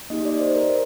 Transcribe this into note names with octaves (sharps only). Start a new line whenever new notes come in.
A#3 D#4 G4 D#5
D5
C5
A#4